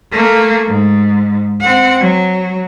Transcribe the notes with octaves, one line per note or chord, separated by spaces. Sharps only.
A3 A#3
G#2
C4 F#5
F#3